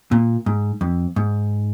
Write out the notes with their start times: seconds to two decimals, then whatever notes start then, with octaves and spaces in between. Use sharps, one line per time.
0.12 A#2
0.46 G#2
0.81 F2
1.16 G#2